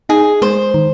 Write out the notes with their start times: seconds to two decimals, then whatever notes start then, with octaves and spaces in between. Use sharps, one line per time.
0.09 D#4 G#4
0.42 G#3 C5
0.74 D#3